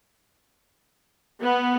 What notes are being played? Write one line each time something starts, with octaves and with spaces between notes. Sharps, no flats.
B3